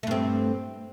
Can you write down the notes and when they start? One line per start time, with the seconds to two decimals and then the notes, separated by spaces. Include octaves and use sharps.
0.03 A3
0.07 G2
0.11 C4